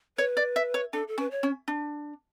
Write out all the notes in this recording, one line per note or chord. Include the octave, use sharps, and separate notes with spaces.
B4 C#5
D5
E5
C#5
D4 A4
A4
C#4 B4
C#5
C#4
D4